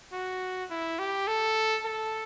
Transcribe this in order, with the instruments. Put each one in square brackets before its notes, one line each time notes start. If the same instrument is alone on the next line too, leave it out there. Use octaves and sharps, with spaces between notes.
[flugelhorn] F#4
E4
G4
A4
A4